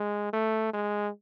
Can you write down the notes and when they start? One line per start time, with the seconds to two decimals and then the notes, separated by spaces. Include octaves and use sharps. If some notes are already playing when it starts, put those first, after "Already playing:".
Already playing: G#3
0.33 A3
0.73 G#3